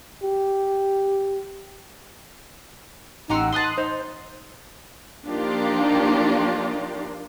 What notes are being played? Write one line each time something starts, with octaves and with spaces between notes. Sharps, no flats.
G4
A1 D#4 G4 F#5 A#5 C6 E6
B4 A5 C6 D#6 F#6
D#4 C5
F3 A#3 D4 D#4 F4 G4